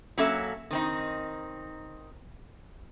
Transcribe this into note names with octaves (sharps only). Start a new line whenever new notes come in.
F#3 A#3 C#4 F#4 A4 E5
D#3 C4 D#4